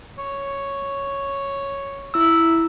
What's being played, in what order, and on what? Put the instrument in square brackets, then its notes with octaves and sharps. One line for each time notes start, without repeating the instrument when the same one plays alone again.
[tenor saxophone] C#5
[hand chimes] E4 E6